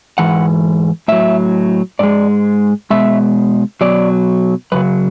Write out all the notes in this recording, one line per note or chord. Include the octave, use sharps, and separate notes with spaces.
G#2 E3 F#5
A2 F#3 E5
G#2 G#3 D5
B2 G#3 E5
B2 F#3 D5
F#2 C#3 F#3 B4